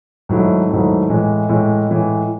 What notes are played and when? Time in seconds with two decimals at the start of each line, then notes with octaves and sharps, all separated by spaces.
0.29 G#2 D#3 F#3 A3 E4
0.69 G#2 D#3 F#3 A3 E4
1.09 A2 E3 G#3
1.49 A2 E3 G#3
1.89 A2 E3 G#3